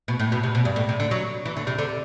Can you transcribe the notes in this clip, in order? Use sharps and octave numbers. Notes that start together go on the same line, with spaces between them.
B2
A2
B2
C3
B2
G2
A2
C3
D3
F#3
E3
D3
C3
D3